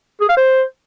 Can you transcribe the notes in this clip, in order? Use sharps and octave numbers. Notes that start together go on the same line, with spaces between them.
G#4
F5
C5